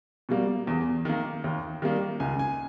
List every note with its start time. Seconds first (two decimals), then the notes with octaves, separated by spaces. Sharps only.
0.29 B2 G3 A#3
0.67 E2
1.05 D#3 A#3
1.44 D#2
1.82 D#3 G3 A#3
2.20 C#2 G#5
2.39 G#5